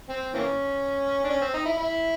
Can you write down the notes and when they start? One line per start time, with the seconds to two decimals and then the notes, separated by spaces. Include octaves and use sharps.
0.10 C4
0.34 E3 A#3 C#4
1.24 D4
1.29 C#4
1.41 C4
1.54 D#4
1.65 E4
1.78 E4